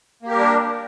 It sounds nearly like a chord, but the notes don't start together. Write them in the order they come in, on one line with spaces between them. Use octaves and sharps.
A#3 G4 A#4 G3 D4